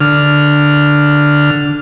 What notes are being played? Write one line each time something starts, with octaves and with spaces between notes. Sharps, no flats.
D3 F6